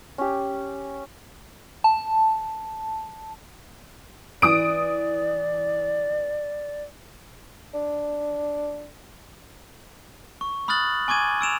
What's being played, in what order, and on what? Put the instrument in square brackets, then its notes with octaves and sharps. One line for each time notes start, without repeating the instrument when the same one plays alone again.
[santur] C#4 G4
[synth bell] A5
[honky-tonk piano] E3 D#6 D7 [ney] D5
[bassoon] D4
[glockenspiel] C#6
B5 D#6 F6 F#6 A6 F#7
G#5 C#6 D6 G#6 D#7
E6 D7 E7 F7